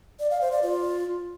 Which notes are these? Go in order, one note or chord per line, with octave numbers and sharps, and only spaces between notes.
D5
F5
C5
D5
F4